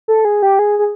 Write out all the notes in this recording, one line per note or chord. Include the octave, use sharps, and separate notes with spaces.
A4
G#4
G4
G#4
G#4